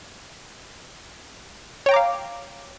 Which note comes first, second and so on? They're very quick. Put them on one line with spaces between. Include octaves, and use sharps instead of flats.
C#5 G5 A#5 D6 F5